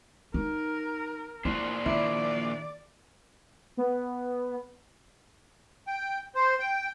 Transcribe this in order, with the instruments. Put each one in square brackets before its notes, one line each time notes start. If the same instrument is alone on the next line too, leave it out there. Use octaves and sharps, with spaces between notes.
[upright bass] D#4 [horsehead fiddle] A#4
[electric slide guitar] A#2 D4 C5 [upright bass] E4
[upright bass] D#3 [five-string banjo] E4 [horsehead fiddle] D5
[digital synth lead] B3
[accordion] G5
C5
G5